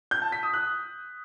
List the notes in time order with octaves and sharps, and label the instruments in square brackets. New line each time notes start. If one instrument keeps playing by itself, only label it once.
[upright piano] G6
A5
B6
D#6
F#6